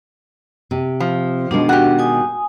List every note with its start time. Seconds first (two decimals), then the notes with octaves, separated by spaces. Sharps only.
0.71 C3
1.00 F3
1.51 B2 D#3 G#3 D4
1.69 F#4 G4
1.99 G#5 D#6